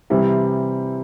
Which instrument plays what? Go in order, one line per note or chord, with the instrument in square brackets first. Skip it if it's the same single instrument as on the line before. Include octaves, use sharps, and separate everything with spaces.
[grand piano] C3 E3 G3 C4 E4